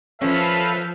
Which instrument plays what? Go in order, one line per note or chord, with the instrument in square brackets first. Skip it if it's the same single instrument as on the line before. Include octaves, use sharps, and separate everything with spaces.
[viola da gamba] F3 [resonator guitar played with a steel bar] C#4 [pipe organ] A4 B4 F5 [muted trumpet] E5